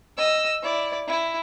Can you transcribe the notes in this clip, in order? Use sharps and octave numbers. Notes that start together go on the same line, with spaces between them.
D#5 E6
E4 D5
E4